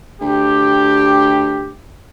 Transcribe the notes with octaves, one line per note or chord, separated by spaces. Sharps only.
D2 G4